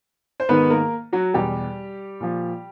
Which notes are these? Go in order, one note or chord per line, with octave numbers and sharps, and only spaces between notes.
C5
G#2 D#3 B3 B4
A#3 A#4
F#3 F#4
E2 B2 G3 G4
A#2 F3